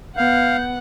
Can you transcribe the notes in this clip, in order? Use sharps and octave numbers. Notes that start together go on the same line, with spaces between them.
B3 F5 F#5 G6